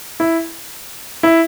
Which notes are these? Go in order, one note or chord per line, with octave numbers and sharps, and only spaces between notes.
E4
E4